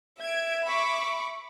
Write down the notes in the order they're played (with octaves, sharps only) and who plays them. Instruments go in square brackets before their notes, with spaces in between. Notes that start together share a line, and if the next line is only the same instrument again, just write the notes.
[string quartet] E5 [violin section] G#6 D7
[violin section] B5 C#6 D6